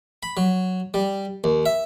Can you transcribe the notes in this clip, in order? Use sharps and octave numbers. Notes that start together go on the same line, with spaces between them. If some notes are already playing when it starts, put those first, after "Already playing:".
B5
F#3
G3
D#2
E5